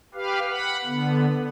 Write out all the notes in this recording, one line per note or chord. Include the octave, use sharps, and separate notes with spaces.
G4 B4 F5
F#5 B5
D3 B3